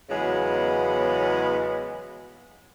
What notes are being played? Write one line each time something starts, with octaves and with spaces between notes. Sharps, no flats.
E2 C#3 F#3 G#3 B3